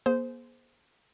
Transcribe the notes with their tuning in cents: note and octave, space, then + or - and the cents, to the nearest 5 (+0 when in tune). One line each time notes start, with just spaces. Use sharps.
A#3 +45 G#4 +30 C5 -10